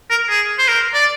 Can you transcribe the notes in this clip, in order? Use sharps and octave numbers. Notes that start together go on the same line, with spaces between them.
A#4
G#4
C5
A#4
D5